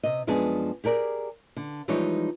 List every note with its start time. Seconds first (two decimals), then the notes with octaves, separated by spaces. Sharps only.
0.03 C3 D#5
0.27 F#2 F3 G#3 B3 D4 G#4
0.84 G4 G#4 A#4 D5
1.57 D3
1.88 E3 F3 G3 G#3 D#4 C#5